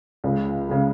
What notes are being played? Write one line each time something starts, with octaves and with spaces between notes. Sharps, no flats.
C#2 C#3 G#3
C#3 G#3